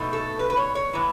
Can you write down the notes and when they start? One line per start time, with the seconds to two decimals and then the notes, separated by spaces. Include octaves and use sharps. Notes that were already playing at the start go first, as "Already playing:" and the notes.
Already playing: B2 A3 D#4
0.13 A4
0.39 B4
0.50 B4
0.57 C#5
0.75 C#5
0.93 A2 E3